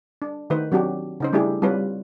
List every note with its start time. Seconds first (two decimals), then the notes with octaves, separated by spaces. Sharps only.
0.22 D4
0.50 D#3 A3 B4 C5
0.72 F#3 C4 D4 F#4 G4
1.20 C#3 D#4 C5
1.33 G3 A3 D4 E4 G4 G#4
1.62 G3 C4 F4 B4 C#5